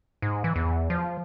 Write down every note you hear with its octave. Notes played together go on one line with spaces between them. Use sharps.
G#2
E3
E2
F3